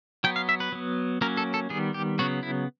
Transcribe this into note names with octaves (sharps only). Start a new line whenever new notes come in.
F#3 B3 G5
F5
E5
B4
F#3 B3
F#3 A#3 C#4 A#4
A4
A4
D#3 G3 B3 G#4
G4
C#3 F#3 B3 F#4
E4